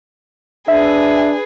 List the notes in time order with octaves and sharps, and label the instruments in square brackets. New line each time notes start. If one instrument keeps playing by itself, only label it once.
[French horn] D4 [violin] G#4 B4 [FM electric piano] E5